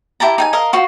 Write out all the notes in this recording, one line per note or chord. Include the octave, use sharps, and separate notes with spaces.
E4 G4 A5 A#5
D#4 G5 G#5
A#4 D#5 F5
F4 F#4 C5